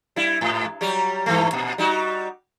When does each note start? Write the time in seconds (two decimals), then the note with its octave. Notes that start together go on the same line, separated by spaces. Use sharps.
0.16 G3 E4
0.41 G#2
0.81 F#3 G3 G4
1.26 G2 E3 A3
1.53 A#2
1.78 G3 D#4 F#4